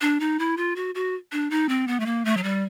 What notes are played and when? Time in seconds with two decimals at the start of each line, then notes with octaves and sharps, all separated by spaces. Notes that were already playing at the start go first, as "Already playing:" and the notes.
0.01 D4
0.20 D#4
0.39 E4
0.57 F4
0.76 F#4
0.95 F#4
1.32 D4
1.51 D#4
1.69 C4
1.88 B3
2.00 A3
2.06 A#3
2.25 A3
2.37 F#3
2.43 G3